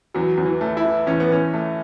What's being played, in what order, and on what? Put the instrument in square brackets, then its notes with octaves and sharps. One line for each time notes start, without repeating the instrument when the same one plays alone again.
[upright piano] E2 [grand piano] F#3
[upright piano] E2
[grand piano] E3
[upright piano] A3
[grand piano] E4
[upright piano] E3
[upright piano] E2 [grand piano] C#4
[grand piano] B3
[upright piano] E2 [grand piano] C#4
[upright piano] A3